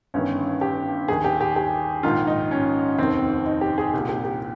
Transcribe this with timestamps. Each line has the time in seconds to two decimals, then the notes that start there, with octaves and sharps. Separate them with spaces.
0.14 G1 G2 D#3 C#4
0.61 G4
1.08 D#2 D#3 G#4
1.24 G4
1.41 G4
1.56 G4
2.03 A#1 G#2 D#3 F4
2.27 D#4
2.51 C#4
2.98 F1 D#2 D#3 C4
3.46 D#4
3.61 G4
3.78 G#4
3.94 C2 A#2 G4
4.09 G4
4.25 G4